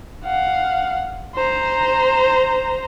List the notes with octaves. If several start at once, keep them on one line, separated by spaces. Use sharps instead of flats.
F5 F#5
C5 A#5